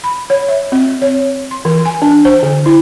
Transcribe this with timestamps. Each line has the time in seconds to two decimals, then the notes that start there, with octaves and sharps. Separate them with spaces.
0.04 B5
0.30 C#5
0.48 E5
0.72 C4
1.02 C#5
1.51 C6
1.65 E3
1.86 G#5
2.02 D4
2.25 C5
2.43 D3
2.66 E4